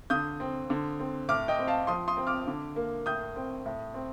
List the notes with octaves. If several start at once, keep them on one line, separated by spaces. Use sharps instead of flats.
D3 D#6 G6
C4
D3
C4
A2 D6 F6
D#5 G5
C4
F5 A5
F3 C6 D#6
C6 D#6
C4
D6 F6
D3
A#3
A2 D#6 G6
C4
A2
C4